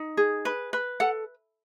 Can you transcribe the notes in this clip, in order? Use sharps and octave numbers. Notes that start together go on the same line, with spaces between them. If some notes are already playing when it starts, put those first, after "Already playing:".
Already playing: D#4
G#4
B4
B4
A4 F#5